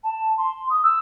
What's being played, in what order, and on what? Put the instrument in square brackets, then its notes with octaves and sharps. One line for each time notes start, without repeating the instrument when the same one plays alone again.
[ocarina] A5
C6
D#6
E6